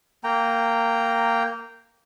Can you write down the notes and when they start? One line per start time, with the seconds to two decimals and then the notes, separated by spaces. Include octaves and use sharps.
0.24 A#3 G5 A#5